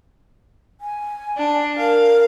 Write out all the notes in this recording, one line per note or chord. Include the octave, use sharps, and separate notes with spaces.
G#5
D4
A#4 F5